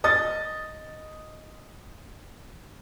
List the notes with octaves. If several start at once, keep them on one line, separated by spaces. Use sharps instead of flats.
D#5 D#6 A6